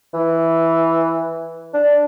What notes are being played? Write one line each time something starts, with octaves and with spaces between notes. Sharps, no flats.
E3
D4